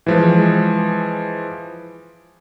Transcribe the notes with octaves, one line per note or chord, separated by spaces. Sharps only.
E3 F3 G#3